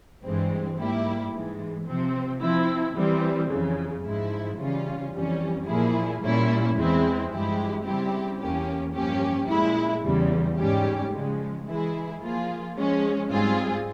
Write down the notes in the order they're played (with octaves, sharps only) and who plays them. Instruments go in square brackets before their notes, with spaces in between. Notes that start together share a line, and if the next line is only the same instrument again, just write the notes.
[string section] G2 E3 G#3 C4
G#2 G3 A#3 E4 G4
G#2 E3 G#3
C3 F3 C4
F3 C4 E4
E3 G3 C4
F2 C#3 E3
G#2 F3 G#3 E4
C#3 E3 G3 C#4 F4
F2 E3 G3 C#4
A#2 F3 A#3 E4 G#4
A#2 G3 A#3 C#4 E4
E2 E3 G#3 C4 E4
G2 F3 G#3 E4 G4
C#3 G3 C4 E4 G4
E2 E3 A#3 C#4 G4
G2 F3 A#3 C#4 G4
A#2 G#3 E4
E2 C#3 E3 G3
G#2 G3 C#4 G4
C#3 F3 G#3
E3 G#3 E4 G#4
F3 A#3 F4 G#4
F3 G#3 C#4
G#2 G3 C4 F4 G#4